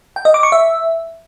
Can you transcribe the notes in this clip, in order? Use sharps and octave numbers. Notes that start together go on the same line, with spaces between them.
G5
D#5
D6
C#6
E5